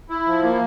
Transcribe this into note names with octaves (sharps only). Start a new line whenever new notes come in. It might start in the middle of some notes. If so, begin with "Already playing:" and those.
E4
F3
A#3